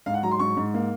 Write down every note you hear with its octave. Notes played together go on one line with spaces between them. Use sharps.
G#2 F5
F#5
F#3 A#5
C6
G#2 C#6
G#2
A#3